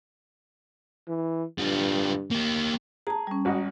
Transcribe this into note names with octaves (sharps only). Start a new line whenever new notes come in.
E3
G2 D3 F4
A#3 G4
G#4 A5 A#5
G3 C#4
G#1 F#4 D#5